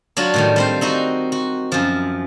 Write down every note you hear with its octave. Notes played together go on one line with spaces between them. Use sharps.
F#3 D4 F4 F#4
A2 D#3 G3
G3 C4 C5
C4 D#4 F#4
F#4
F#2 F3